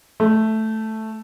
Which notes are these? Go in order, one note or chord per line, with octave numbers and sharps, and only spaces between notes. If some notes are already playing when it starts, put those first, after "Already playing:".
A3